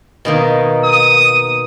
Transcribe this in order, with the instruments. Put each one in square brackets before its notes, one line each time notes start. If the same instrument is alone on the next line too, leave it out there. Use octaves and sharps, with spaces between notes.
[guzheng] B2 D#3 A#3
[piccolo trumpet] D#6